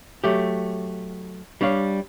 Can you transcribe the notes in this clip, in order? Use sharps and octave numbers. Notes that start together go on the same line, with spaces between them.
F#3 A3 G4
G3 D4 C#5 F5